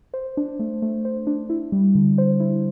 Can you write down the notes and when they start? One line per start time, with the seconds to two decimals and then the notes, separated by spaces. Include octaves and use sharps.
0.14 C5
0.37 D4
0.59 A3
0.82 A3
1.05 C5
1.27 D4
1.50 E4
1.72 G3
1.95 D3
2.18 C5
2.40 E4